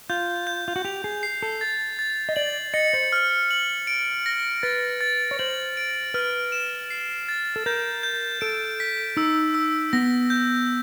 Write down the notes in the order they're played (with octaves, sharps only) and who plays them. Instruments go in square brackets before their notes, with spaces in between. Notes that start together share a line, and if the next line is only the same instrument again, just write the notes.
[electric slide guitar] F4 [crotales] G6
[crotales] G6
[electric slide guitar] F4
F#4
[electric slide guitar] G4 [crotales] F7
[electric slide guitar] G#4
[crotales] C7
[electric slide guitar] A4
[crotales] A6
A6
[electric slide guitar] D#5
[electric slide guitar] D5 [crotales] F#7
[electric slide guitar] D#5 [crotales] C#7
[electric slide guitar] C5
[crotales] F6
F#7
D7
A#6
[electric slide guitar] B4 [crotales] A6
[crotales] A6
[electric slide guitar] C#5
[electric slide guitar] C5 [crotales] F#7
[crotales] D7
[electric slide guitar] B4 [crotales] F6
[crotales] E7
C7
A6
[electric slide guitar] A4
[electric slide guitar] A#4 [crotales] G6
[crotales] G6
[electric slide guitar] A4 [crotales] D7
[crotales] B6
[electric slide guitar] D#4 [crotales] E6
[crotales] E6
[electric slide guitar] B3 [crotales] A#6
[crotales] G6